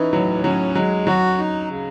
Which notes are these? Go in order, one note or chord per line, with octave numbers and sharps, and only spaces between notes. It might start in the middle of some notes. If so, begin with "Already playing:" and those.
Already playing: E3 C#4 D#4
A2 F#3
F#3 C#4
F#3 G#3
F#3 F#4
D#4
C#3